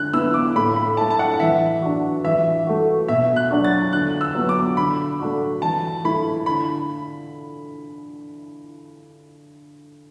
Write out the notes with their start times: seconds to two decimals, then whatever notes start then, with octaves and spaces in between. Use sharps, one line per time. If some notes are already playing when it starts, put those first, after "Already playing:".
Already playing: D3 F#6
0.13 B3 E4 E6
0.34 D6
0.56 A2 B5
0.76 B5
0.97 A3 E4 A5
1.10 A5
1.19 F#5
1.40 E3 E5
1.82 D4 F#4
2.24 E3 E5
2.67 A3 F#4
3.08 B2 E5
3.36 F#6
3.51 F#3 D4 F#4
3.65 A6
3.93 D3 F#6
4.21 E6
4.35 F#3 B3
4.49 D6
4.77 D3 B5
5.19 A3 D4 F#4
5.62 E3 A5
6.04 A3 E4 B5
6.46 D3 B5